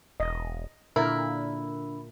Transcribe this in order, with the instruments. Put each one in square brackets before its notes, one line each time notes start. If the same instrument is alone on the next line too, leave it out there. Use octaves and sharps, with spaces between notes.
[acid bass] E1 [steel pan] D#5
[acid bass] A#2 [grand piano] D3 [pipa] E4 [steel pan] A#4